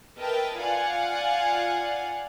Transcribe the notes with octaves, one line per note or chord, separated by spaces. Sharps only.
A#4 B4 D#5 E5 G5 A5
F4 D5 F5 F#5 G#5